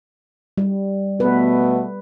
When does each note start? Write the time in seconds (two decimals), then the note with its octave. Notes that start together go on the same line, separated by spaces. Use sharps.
0.58 G3
1.20 B2 A3 B3 B4